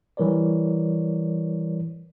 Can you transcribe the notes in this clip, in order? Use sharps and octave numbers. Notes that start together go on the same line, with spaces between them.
E3 G3 A#4 C#5 D5